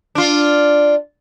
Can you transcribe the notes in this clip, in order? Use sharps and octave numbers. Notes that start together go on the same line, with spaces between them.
D4 F4